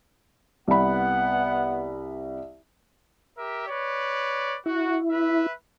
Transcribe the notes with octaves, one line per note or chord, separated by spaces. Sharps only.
C2 B3 F#5 B5
G4 A#4 E5
B4 C#5 D5
E4 F#4
B4 E5